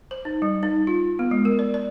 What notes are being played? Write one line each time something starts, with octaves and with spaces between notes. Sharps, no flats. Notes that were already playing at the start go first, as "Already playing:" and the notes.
C5
D#4
G3
D#4
F4
B3
G#3
A#4
D5
D5